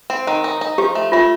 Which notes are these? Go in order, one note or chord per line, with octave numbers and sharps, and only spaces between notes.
C4
D#3
D#4
D#4
F3 G4
A3
A3 F4